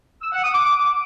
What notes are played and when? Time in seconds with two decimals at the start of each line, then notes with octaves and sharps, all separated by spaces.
0.21 E6
0.32 F#5
0.43 D#6
0.53 D6